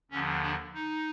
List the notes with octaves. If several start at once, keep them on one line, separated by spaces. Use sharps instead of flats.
D#2 D3 F3 C#4
D4
D#4